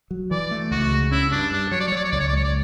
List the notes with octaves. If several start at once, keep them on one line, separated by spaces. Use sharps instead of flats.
F#3
E3 D5
A3
C#2 F#4
C#3
C#4 E4
G2 D4
G2 D4
F#3 C#5
D5
C#5
F#3 D5
C#5
C#2 D5
C#5
D5
C#2 C#5
D5